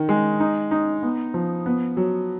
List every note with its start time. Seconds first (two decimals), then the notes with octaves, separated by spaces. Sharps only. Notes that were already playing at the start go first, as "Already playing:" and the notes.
Already playing: D#3
0.09 G#3
0.40 D#4
0.71 D#4
1.03 B3
1.34 F3
1.66 B3
1.97 F#3